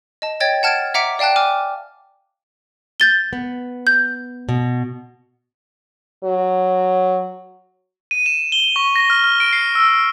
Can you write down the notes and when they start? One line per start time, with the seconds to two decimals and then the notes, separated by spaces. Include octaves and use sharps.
0.22 D#5 A5
0.40 C#5 D#5 G5 G#6 A6
0.63 F#5 A5 F6 G#6 A6 D7
0.94 E5 F#5 A#5 D6 B6 D7
1.19 D5 F5 G5 A5 F#6
1.36 G#5 D6 F6
3.00 G6 A6 G7
3.33 B3
3.87 G6
4.49 B2
6.24 F#3
8.11 D#7
8.26 E7
8.52 G7
8.76 C#6
8.96 A#6
9.10 F6
9.24 F6
9.40 D7
9.53 C7
9.75 E6